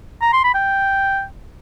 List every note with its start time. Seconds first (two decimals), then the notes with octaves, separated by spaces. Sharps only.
0.22 A#5
0.33 C6
0.44 B5
0.54 G5